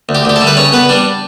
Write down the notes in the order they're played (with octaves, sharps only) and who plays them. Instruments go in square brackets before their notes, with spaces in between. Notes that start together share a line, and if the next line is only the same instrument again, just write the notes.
[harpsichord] D2
G4
D2 G4
A4
G3
B4
C#3 C#5
B3 B4
G3 D4